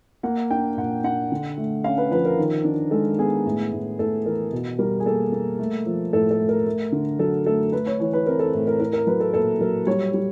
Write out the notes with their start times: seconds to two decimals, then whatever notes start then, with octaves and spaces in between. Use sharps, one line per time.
0.23 A#3 F#5
0.50 D4 G5
0.77 A#2 F#5
1.04 D4 F#5
1.32 D3
1.57 A3
1.84 C#4 F5
1.98 B4
2.11 F3 B4
2.25 A#4
2.37 D#3
2.64 D4
2.91 G#3 A4
3.18 B3 G#4
3.46 A2
3.72 A2
3.99 A2 A4
4.26 E3 A#4
4.53 B2
4.79 G3 A#4
5.00 G#4
5.06 A#3 A4
5.32 A#3
5.59 A3
5.86 F3
6.13 A2 A4
6.31 A4
6.40 A3
6.49 A#4
6.67 A3
6.92 D3
7.19 F#3 A4
7.46 A3 A4
7.72 A3 B4
7.86 C#5
8.00 E3 C#5
8.13 B4
8.26 C4 A#4
8.39 A4
8.54 A2 A4
8.67 A#4
8.80 E4 A#4
8.93 A#4
9.07 F#3 B4
9.20 A4
9.34 A#2 A4
9.60 F#3 A#4
9.87 G3 C#5
10.14 G3